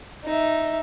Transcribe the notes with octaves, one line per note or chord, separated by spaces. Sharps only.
D#4 E5